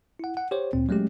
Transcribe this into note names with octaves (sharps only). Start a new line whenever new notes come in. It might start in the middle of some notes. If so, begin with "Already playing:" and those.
E4 F#5
F#5
G4 C5 C#5
D2 A#2 C4
F#3 G#3 A3 C#4 G4